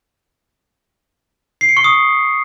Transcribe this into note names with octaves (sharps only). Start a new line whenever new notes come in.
C7
C#7
C#6
D#6